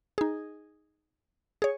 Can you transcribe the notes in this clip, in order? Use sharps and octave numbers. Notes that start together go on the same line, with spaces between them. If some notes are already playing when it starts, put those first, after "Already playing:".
D#4 G#4
G#4 C#5